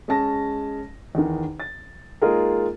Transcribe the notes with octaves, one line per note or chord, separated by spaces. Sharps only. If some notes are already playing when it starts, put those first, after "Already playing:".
G#3 C#4 G#4 A5 A#6
E2 D#3
A6
G#3 A#3 D#4 F4 G#4 A#4